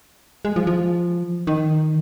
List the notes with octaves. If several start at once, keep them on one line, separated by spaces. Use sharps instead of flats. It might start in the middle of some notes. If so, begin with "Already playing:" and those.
G#3
F3
F3
D#3